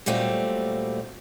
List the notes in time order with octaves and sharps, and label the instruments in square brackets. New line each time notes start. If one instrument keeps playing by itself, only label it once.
[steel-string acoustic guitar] A#2 F#3 G3 A3 C4